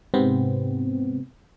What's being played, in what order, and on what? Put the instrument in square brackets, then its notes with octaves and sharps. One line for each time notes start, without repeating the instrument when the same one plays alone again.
[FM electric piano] G#2 C3 B3 C4